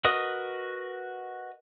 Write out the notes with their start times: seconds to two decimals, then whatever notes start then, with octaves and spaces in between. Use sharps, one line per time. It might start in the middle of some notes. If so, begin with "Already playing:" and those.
0.05 F#4 A#4 B4 D#5 D#6